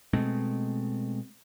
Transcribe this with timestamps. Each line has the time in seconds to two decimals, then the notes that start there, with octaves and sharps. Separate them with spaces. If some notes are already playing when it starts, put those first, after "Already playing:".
0.13 B2 G#3 A3 C4